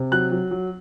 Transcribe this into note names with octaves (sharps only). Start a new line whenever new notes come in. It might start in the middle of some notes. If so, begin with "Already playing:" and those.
Already playing: C3
F#3 F#6
F#3
F#3